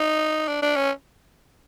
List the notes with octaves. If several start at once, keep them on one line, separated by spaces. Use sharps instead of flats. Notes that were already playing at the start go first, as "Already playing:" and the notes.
Already playing: D#4
D4
D4
C#4